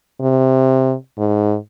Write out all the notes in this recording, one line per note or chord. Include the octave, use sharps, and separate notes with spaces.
C3
G#2